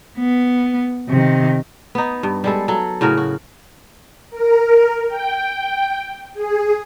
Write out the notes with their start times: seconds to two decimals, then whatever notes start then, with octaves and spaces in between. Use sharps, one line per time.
0.18 B3
1.09 C3 D#3
1.95 B3 D#4
2.23 G2
2.44 G3 G#3 A4
2.68 F#3 A4
3.01 A2 C#3 F#4 A#4
3.17 F#4
4.31 A#4
5.08 G5
6.34 G#4